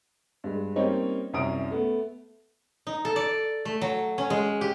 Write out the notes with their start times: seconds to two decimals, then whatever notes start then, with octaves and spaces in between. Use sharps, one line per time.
0.44 G2 G#3
0.76 G3 A#3 C4 C#4 D#4 C#5
1.33 C2 F#2 C#4 D#6 D7
1.71 A3 B3
2.87 D#4
3.05 A4
3.16 D5
3.65 A3
3.81 F#3
4.18 C#4
4.30 G#3
4.61 G4